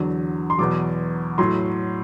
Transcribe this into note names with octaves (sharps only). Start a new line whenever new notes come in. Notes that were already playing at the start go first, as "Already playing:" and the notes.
Already playing: E2 D3 F#3
C6
E2 B2 F#3 D6
A2 F#3 C6